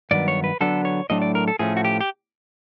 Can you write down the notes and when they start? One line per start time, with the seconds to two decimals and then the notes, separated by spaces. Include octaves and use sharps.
0.11 G2 D#3 F#3 B3 D5
0.28 C#5
0.44 B4
0.61 D3 F#3 B3 D4 A4
0.85 C#5
1.10 A2 F#3 A3 D4 D#5
1.22 D5
1.35 A#4
1.48 A4
1.59 A2 F3 A3 C#4 G#4
1.77 F#4
1.85 G4
2.01 G4